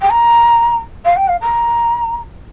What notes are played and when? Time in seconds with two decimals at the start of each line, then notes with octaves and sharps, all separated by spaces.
0.01 G5
0.10 A#5
1.05 F5
1.16 G5
1.28 F5
1.41 A#5